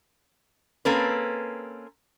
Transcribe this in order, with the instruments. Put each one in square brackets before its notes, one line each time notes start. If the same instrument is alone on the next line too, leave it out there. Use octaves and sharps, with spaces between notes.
[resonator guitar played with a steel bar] A#3 C4 C#4 A4 B4